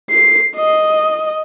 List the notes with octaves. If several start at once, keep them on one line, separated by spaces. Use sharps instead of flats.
C7
D#5